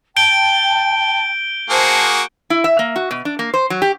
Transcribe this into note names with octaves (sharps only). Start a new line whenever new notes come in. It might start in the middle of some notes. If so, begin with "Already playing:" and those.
G5 A5 G6 D7 G7
A#3 F#4 G#4 C5 A5
E4
E5
A#3
F#4
B2
D4
A#3
C5
F#3
G4